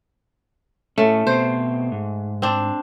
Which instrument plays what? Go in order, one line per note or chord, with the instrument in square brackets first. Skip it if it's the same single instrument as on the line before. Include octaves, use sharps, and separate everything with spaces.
[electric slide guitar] A2 C#4 [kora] A3
[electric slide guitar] B2 C4 [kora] C5
[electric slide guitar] G#2
[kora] C4 D4